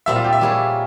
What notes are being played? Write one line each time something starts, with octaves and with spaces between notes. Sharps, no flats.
A#2 G3 C4 E5
F4
G4
E5
G3 A#3 E4 G#4 C#5